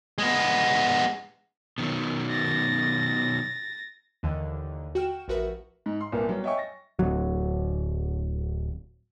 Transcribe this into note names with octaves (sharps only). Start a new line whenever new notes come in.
G#3 B3
B2 D#3 F#3
A6 A#6
D#2 D3 E3
F#4 G5 F6 E7
A1 F3 F#4 A#4 B4 E5
G#2
C6
C2 A#2 A#3 B3
F#3 G3 B3
C#5 D#5 E5 G5 G#5 C#6
A6 A#6
D1 F#3